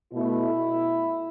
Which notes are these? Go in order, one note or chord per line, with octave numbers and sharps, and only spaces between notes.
B2 A3 E4